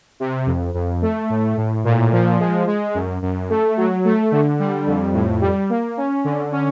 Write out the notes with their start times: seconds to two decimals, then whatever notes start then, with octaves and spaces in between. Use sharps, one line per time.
0.20 C3
0.46 F2
0.74 F2
1.02 A3
1.30 A2
1.57 A2
1.85 A#2
2.12 F3
2.40 G#3
2.67 G#3
2.95 F#2
3.22 F#2
3.50 A3
3.77 F#3
4.05 A3
4.32 D3
4.59 G3
4.87 F2
5.14 A2
5.41 G3
5.70 A#3
5.97 C#4
6.24 D3
6.52 C#4